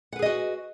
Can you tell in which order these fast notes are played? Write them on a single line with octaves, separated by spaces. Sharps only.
F#5 B4 G#4 D#5 F#4